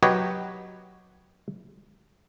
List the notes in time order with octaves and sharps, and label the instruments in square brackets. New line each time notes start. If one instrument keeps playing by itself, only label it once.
[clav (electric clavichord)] F#3 G4 B4 C#5 D#5